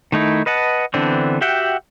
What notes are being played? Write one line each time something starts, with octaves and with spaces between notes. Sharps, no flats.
D#3 A3 D#4 E4
B4 D#5 F#5 A5
D3 E3 B3 C4 D4
F#4 G4 E5 F#5 G5